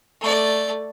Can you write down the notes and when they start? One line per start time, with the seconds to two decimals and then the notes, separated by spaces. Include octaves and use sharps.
0.21 A3 D5